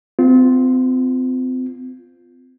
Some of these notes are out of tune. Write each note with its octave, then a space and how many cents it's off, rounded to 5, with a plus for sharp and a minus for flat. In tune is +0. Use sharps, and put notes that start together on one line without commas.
C4 -35 F4 +0